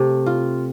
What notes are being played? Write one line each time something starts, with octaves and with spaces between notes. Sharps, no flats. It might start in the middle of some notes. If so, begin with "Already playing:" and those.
Already playing: C3 A3
F4